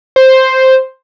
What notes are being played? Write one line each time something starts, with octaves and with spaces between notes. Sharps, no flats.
C5